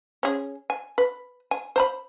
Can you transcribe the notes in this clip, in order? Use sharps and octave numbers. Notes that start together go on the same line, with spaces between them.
C#4 G#4
G#5
B4
G#5
C5 A#5 B5